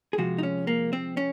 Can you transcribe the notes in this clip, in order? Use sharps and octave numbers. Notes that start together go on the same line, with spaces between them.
G#4
C3 F3 G#3 F#4
D#4
C#4
A#3
C4
C#4